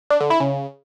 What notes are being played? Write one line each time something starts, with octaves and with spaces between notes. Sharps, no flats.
D4
D3
E4
C#3